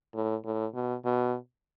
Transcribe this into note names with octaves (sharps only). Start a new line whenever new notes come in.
A2
A2
B2
B2